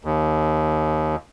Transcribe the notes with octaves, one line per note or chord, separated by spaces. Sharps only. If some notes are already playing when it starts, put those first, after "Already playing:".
D#2